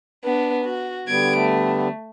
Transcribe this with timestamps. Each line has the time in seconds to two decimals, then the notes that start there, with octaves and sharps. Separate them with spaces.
0.24 B3 D4
0.65 F#4
1.08 D3 G3 B3 G#6 D7
1.37 A3